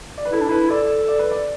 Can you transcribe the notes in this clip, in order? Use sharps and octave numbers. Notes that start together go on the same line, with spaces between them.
D5
B4
E4 A4
D4
E4 B4
A4 D5
D5
B4
D5